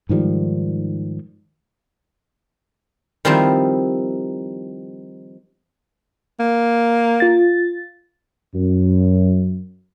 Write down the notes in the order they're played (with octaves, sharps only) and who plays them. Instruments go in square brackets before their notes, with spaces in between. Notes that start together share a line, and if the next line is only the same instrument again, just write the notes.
[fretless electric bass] G#2 D#3 F3 G3
[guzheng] D#3 F3 G3 C4 D#4 E4
[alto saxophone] A#3
[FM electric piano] F4 A6
[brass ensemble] F#2